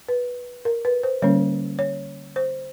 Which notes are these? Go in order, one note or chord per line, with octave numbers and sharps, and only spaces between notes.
B4
A#4
B4
C5
D3 G3 A#3 C#4 C#5
C#5
C5